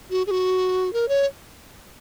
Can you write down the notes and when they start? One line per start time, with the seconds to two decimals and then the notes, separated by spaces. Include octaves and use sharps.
0.10 F#4
0.27 G#4
0.31 F#4
0.93 A#4
1.08 C#5